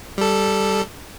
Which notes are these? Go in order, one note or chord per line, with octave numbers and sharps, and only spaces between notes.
G3 A4